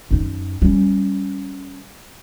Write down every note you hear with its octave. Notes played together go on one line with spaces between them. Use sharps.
F#2 D#4
G3 C#4